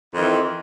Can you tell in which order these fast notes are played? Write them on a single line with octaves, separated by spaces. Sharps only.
F2 D#3 E3